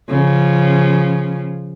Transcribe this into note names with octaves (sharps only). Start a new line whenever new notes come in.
C#3 F3